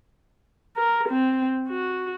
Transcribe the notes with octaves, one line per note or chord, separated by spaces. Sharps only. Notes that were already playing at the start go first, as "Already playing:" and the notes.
A#4
C4
F#4